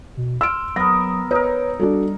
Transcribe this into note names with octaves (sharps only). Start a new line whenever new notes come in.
B2
C6 E6 F6 D7
F#3 B3 A#4 A#6
D#4 A#4 B4 C#5
G3 D4 F#4 A4